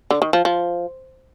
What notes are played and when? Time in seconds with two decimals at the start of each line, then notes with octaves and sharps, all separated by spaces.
0.11 D3
0.22 D#3
0.33 F3
0.45 F3